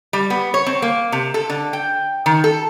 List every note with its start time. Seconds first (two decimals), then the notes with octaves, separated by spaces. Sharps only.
0.13 G3
0.30 B3
0.54 C#5
0.66 C4
0.82 A#3
1.12 C3
1.34 A4
1.49 D3
1.73 G5
2.26 D#3
2.44 A4